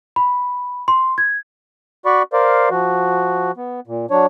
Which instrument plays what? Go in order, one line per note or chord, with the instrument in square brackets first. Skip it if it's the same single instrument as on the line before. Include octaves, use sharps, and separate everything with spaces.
[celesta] B5
C6
G#6
[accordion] F#4 D5 B5 C#6
A#4 C5 D5 F5
F3 F#4
B3
A#2
F#3 D4 C#5